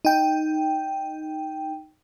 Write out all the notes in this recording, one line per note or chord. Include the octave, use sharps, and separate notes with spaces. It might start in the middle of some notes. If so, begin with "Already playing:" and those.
D#4 G5